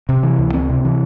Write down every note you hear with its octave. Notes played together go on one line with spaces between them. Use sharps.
C3
E3
C#2
C4
C3
E3